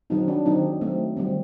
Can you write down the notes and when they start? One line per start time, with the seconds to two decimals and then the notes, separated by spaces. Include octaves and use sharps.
0.10 D#3 F#3 C4 D#4
0.28 D4
0.46 D#3 F#3 C4 D#4
0.81 F#3 A3 C4
1.17 D#3 G3 C4